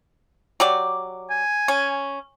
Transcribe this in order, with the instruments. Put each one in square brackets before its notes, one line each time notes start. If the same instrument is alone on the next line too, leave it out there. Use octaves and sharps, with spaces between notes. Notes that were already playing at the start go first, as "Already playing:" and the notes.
[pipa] F#3 G4 D5
[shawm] G#5
[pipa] C#4